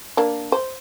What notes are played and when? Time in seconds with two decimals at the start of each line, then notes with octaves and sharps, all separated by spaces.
0.17 A#3 D4
0.52 C5